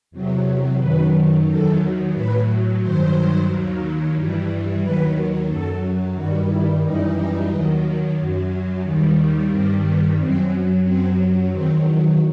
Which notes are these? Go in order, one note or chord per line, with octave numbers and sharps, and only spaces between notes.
E2 C3 F#3
F#2 D#3 F#3 B4
E2 D#3 F#3 A4
A2 F#3 B4
G2 D#3 F#3 C5
D#2 D#3 F#3
G2 E3 G3
D#2 D#3 F#3 B4
F#2 F#3 A4
G2 D#3 G3 F#4
E4
F#2 E3 G3 D#4
D#2 D#3 F#3
F#2 F#3
D#2 D#3 G3
G2 D#3 G3 C4
B3
F#2 F#3 C4
F#2 F#3 C4
E2 D#3 F#3 C4